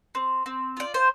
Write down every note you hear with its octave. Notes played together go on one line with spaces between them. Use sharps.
C4
C4
F4 D5
C5